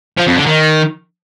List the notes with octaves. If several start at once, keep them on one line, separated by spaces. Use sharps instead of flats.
F3
F2
D3
D#3